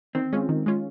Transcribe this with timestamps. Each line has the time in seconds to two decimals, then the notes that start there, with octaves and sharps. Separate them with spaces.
0.15 D#3 C4
0.33 G#3 C#4 F4
0.49 D#3
0.66 G#3 C#4 F4